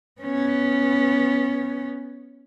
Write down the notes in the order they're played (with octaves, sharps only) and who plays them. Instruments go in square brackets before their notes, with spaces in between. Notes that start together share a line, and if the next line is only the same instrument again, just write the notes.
[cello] B3 C#4